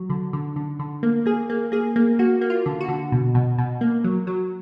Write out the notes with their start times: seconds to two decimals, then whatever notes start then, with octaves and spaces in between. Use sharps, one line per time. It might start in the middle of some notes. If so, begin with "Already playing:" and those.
Already playing: F#3
0.10 D3
0.33 D3
0.56 D3
0.79 D3
1.03 A#3
1.26 A#3 G#4
1.50 A#3
1.72 A#3 G#4
1.96 A#3
2.19 A#3 F#4
2.41 A#3
2.50 F4
2.66 D3
2.81 F#4
2.88 D3
3.12 B2
3.35 B2
3.58 B2
3.81 A#3
4.04 F#3
4.27 F#3